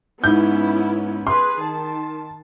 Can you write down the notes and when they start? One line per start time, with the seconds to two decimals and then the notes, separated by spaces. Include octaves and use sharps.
0.24 G#2 B3 C#4 E4 G6
1.27 G#4 B4 C6
1.57 D#3 A5